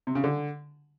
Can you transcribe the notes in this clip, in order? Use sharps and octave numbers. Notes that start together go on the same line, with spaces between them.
C3
C#3
D3